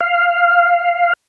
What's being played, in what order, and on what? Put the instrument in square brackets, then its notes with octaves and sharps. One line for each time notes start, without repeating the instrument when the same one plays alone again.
[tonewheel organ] F5